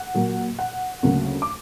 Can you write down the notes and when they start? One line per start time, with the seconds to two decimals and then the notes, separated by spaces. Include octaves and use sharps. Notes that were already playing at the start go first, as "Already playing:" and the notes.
Already playing: F#5
0.14 A#2 F#3 A#3
0.59 F#5
1.03 D2 C#3 F#3 A#3 C#4
1.42 D6